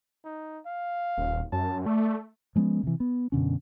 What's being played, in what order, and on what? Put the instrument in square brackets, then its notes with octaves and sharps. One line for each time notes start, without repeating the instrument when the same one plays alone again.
[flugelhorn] D#4
F5
[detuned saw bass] D#1
[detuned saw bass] F#2 [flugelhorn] A5
[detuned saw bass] A3 [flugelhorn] D5
[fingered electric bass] F3 G#3 B3 C#4
C3 E3
B3
F#2 B2 D3 C#4